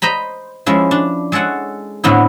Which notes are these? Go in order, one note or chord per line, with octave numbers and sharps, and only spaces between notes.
C5 D#5 A#5 B5
F3 G#3 C#4 E4
D4
G#3 A4 C#5 F#5 G#5
A2 D3 B3 C4 E4